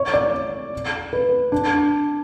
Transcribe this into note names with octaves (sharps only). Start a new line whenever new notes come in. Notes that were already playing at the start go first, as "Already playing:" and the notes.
Already playing: C#5
D5
B4
D4